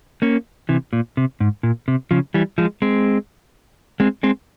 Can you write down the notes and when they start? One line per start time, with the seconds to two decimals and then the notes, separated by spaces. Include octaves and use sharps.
0.22 A#3 C#4
0.69 C3 E3
0.93 A#2
1.17 C3
1.40 G#2
1.63 A#2
1.88 C3
2.11 C#3 F3
2.34 E3 G3
2.58 F3 G#3
2.82 G#3 C4
4.00 G#3 C4
4.23 G#3 C4